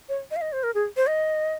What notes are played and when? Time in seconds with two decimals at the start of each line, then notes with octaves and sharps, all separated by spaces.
0.09 C#5
0.31 D#5
0.36 F5
0.42 D#5
0.53 C5
0.63 A#4
0.75 G#4
0.97 C5
1.07 D#5